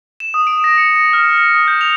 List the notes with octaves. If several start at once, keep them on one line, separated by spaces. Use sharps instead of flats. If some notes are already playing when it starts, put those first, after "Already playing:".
E7
D#6
D7
A#6
C#7
A#6
F6
A#6
D#6
G6
F7